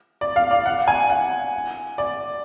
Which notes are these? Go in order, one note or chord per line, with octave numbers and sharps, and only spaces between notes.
D5
F5
D5
F#5
G#5
F#5
D5